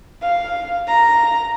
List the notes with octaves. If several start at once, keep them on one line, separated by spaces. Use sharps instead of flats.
F5
A#5